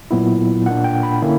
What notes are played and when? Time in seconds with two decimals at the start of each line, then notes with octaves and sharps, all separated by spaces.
0.11 A#2 F#3 B3 E4
0.66 A#2 A#3 D4 F#5
0.84 G5
1.03 B5
1.22 D3 A#3 C#4 E4